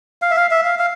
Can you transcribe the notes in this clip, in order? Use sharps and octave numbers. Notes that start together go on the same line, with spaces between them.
F5
E5
F5
E5
F5
F5